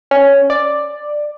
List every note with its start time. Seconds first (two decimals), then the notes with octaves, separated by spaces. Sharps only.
0.11 C#4
0.50 D5